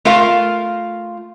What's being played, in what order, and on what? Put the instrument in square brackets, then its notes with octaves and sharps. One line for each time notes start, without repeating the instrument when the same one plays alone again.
[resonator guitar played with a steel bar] A3 F4 A#4 F5